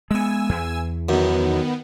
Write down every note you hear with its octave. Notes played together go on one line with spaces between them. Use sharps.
G#3 B3 G#5 E6
E2
F#2 D#3 B3